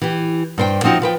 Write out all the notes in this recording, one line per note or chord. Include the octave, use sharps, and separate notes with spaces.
E3 G4
G2 C5 G5
F3 C4 D#4 F#4
F3 B4 G5